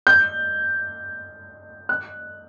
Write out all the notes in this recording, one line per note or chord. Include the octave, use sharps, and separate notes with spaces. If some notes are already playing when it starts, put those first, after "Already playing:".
G6
F#6